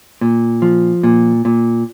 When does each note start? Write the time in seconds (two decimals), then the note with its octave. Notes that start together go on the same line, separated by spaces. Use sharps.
0.21 A#2
0.62 F3
1.03 A#2
1.45 A#2